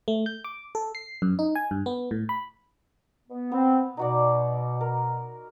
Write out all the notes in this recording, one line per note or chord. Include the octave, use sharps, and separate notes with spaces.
A3
G6
D6
A4
C7
F#2
D#4
G#5
G2
B3
A2
B5
B3
B3 C4
B2 D#4 F#4 D5
A#4